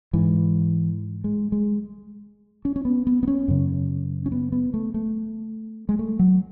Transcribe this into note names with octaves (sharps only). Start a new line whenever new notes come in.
G#2 E3
G#3
G#3
C#4
C#4
B3
B3
B3
C#4
F#2 C#3
C#4
B3
B3
A3
A3
G#3
A3
F#3